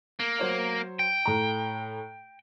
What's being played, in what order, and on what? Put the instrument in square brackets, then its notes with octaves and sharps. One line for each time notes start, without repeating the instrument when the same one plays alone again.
[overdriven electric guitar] A#3
[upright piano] F#3 C5 C#5
[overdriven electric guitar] G5
[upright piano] A2 A#5